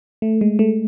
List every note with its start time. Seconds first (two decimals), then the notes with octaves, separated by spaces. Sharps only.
0.22 A3
0.41 G#3
0.59 A3